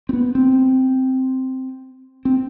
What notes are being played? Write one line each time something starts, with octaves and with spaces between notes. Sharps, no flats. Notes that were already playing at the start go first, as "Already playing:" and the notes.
C4
B3
C4
C4